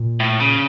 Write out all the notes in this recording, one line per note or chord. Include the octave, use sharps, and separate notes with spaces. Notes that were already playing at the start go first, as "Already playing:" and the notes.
Already playing: A#2
A2
C#3